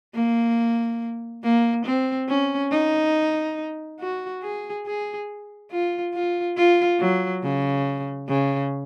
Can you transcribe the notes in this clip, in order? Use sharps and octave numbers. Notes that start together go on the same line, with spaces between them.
A#3
A#3
C4
C#4
D#4
F#4
G#4
G#4
F4
F4
F4
F#3
C#3
C#3